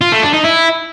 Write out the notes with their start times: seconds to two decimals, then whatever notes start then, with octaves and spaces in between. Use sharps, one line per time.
0.01 F4
0.12 A3
0.23 D4
0.34 D#4
0.45 E4